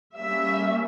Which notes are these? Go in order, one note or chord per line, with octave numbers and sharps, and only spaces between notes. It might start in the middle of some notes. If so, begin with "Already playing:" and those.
G3 A#3 C#4 E5